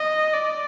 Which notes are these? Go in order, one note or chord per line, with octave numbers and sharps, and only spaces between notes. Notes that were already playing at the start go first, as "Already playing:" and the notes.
Already playing: D#5
D5